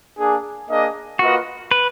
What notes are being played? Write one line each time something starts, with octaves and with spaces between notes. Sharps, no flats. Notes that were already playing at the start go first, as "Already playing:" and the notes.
A#3 D4 G#4
A#3 D4 G#4 D#5
A#3 F4 F#4 B4 D#5
B4